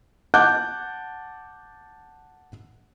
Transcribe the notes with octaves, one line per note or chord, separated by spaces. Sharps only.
F#5 A5 D6 F#6 G6